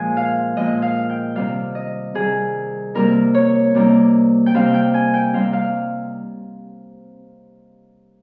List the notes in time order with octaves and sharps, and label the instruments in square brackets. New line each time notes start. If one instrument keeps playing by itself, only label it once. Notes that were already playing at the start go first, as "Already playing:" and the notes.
Already playing: [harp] A#2 F3 G#3 G#5
F5
A#2 F3 G#3 D#5
F5
G5
C3 D#3 G3 F5
D#5
C3 D#3 G3 G#4
C3 G3 A#3 D#4 A#4
C#5
C3 G3 A#3 D#4
G5
C3 G3 C4 D#4 F5
G5
G#5
G5
C3 G3 C4 D#4 F5
F5